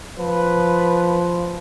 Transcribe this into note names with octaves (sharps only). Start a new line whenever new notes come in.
F3 B4